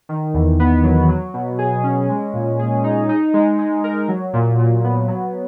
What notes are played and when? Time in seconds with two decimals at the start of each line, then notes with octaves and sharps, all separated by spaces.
0.09 D#3
0.34 E2
0.60 B3
0.84 F#3
1.09 F#3
1.34 B2
1.59 G#4
1.84 C#4
2.09 G#3
2.33 A#2
2.59 G#4
2.84 D#4
3.09 D#4
3.34 G#3
3.59 G#3
3.84 A#4
4.08 F#3
4.33 A#2
4.59 A#2
4.84 B3
5.08 F#3